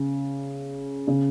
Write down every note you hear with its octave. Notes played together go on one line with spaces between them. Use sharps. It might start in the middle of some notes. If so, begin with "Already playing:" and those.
Already playing: C#3
C#3